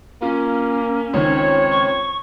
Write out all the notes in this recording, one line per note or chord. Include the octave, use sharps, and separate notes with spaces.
A#3 C#4 F4
C#2 D#3 C4 C#5
C#6